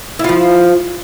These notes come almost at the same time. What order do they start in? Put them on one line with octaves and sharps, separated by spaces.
E4 F4 F3